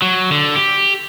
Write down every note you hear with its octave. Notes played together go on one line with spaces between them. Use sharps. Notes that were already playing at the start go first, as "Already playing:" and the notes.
F#3
D3
G4